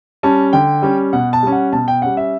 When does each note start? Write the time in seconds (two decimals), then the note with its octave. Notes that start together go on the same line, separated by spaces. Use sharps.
0.23 G3 C#4 A5
0.53 D3 G5
0.82 G3 C#4
1.13 B2 F#5
1.33 A5
1.42 G3 C#4
1.52 F#5
1.73 B2 A5
1.88 G5
2.02 G3 C#4 F#5
2.17 E5